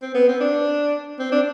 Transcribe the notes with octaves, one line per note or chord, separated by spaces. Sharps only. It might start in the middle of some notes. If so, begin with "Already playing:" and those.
C4
B3
C4
D4
C4
D4